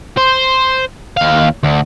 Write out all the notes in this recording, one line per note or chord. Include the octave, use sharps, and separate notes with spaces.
C5
D#2 F5
D2